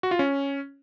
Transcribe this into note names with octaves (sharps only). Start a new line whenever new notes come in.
F#4
F4
C#4